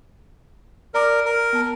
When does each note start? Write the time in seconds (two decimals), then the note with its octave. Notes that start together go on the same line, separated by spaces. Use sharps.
0.94 A#4 D5 D6
1.25 A#4
1.53 B3 A5